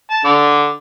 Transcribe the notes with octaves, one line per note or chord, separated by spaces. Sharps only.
A5
D3 D6